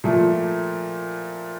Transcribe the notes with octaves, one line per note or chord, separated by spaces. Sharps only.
A#2 F3 A3